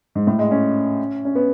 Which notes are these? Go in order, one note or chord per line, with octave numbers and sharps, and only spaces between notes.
G#2
A2
G#3
C#4
C#4
B3